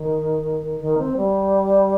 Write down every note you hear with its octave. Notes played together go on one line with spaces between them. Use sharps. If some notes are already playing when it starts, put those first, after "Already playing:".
Already playing: D#3
D#3
C4
G3